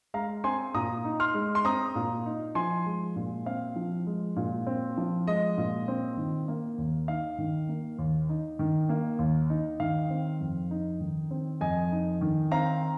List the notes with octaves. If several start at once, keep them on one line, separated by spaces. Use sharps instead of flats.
G#3 F5 A#5
C4 G#5 C6
A#2 A#5 D#6
D#4
C6 F6
G#3
C6
C4 A#5 D#6
A#2
D#4
F3 G#5 C6
G#3
A#2
C4 F5
F3
G#3
A#2
C4
F3
G#3 D#5
A#2
C4
D#3
A#3
D#2
D#4 F5
D#3
A#3
D#2
D#4
D#3
A#3
D#2
D#4
D#3 F5
C4
F2
D#4
D#3
C4
F2 D#5 G#5
D#4
D#3
C4 F5 A#5